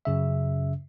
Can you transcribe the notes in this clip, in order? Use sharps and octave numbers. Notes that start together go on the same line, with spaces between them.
F#2 C#3 E5